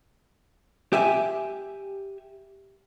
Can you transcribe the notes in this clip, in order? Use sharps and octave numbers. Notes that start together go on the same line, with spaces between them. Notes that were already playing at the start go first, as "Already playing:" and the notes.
G4 E5 G#5